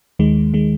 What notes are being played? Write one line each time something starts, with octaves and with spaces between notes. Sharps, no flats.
D#2 D#3 G#3
D#3 G#3